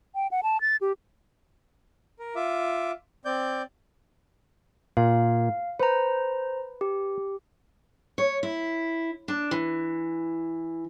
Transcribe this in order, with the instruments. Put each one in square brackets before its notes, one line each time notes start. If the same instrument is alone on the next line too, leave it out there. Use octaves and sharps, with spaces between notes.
[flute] G5
F#5
A5
A6
G4
[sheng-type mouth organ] A#4
F4 E5 D6
C4 D5 G6
[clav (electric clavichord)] A#2 [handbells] F5
[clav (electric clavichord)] B4 [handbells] C5 A#5
[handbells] G4
[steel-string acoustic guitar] C#5
E4
D4
E3